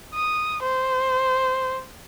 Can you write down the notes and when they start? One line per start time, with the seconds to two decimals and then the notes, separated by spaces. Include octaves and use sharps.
0.14 D#6
0.63 C5